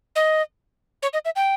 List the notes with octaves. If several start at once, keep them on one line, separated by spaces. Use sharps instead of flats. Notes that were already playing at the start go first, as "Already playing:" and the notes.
D#5
C#5
D#5
E5
G5